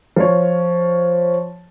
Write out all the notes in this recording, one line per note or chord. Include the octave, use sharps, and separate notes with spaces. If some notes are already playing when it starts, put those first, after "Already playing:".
F3 C#5